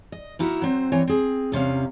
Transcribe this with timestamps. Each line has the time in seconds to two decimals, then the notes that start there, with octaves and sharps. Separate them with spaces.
0.12 D#5
0.39 A#3 D#4 E4 F#4 A#4
0.62 F#3 C4 C5
0.92 E3 C4 C#5 G#5
1.07 C4 G#4
1.52 E2 C3 C#4 F5